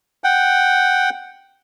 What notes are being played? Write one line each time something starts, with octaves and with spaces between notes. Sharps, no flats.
F#5 G5